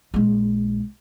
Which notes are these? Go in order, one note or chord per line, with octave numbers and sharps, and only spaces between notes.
A#1 G#3